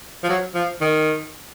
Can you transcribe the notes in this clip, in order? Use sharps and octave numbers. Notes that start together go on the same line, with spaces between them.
F3
F#3
F3
D#3